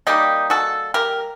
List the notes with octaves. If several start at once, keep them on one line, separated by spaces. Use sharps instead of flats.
D#3 G3 A#3 D#4 G4
F#4 A4
G4 A#4